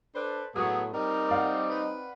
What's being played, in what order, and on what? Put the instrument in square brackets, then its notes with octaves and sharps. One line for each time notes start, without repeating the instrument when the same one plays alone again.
[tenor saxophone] D4 [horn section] A4 B4 C5
[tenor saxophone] A2 [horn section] F#3 [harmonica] B3 G#4 [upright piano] D#6
[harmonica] G3 D#4 [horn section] C4 [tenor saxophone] A#4
[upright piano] D5 F5 F#5
[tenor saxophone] B4